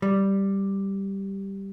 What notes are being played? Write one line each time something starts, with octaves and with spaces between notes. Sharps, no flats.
G3